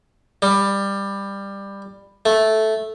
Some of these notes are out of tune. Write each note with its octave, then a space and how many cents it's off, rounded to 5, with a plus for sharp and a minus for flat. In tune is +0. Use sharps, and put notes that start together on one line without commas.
G3 +15
A3 -5